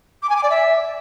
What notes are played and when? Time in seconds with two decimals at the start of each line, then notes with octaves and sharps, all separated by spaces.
0.23 D6
0.29 G#5
0.36 D6
0.43 D5
0.50 E5